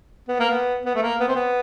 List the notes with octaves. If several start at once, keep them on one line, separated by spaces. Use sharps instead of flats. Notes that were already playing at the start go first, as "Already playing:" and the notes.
B3
A#3
B3
B3
A3
A#3
B3
C4
B3